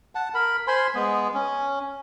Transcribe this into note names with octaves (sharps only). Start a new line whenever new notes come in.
F#5 A5
A#4 B5
C5 G#5 B5 C6
G#3 B3
C#4